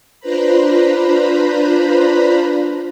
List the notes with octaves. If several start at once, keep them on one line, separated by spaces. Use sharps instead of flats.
D4 F4 B4 C5 A#5 B5